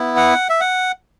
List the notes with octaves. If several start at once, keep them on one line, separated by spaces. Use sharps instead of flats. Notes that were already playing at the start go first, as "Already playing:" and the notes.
Already playing: B3 E4
F#5
E5
F#5